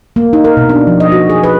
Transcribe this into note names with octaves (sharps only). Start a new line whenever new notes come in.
A#3
D#4
A#4
B2
D4
F3
D#5
F#4
G#4
B4